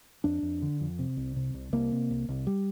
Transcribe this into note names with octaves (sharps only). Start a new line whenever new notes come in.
F2 D4
F2
D3
F2
C3
C2
C3
C2
C2 A#3
C3
C2
C2
G3